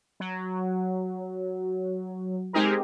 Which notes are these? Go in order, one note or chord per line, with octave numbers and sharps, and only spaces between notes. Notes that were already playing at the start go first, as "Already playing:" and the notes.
F#3
G#3 C4 D#4 G4 G#4 A#4